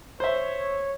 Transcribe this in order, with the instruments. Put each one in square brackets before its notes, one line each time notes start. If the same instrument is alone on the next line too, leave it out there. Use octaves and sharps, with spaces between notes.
[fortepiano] C5 E5 [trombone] C#5